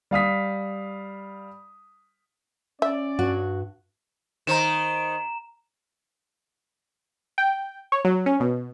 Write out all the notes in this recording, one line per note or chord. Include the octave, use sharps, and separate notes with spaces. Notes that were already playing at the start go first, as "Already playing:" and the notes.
G3 F5 D#6 B6
C#4 D5 E5
G2 F#4
D#3 C5 A#5 E7
G5
C#5
F#3
C#4
B2